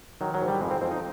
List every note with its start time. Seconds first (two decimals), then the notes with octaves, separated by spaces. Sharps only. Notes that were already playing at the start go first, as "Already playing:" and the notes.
0.21 D#3 F#3
0.34 F#3
0.41 G#2
0.48 G3
0.61 F2 G#3
0.71 C4
0.81 F2 C4
0.91 D#4